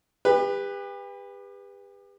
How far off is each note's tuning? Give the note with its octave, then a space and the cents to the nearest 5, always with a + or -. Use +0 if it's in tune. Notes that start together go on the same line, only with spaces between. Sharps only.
G4 +40 B4 +0